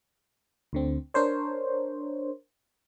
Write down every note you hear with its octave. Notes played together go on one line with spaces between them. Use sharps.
D2 D3 C4
D4 A#4 C5 C#5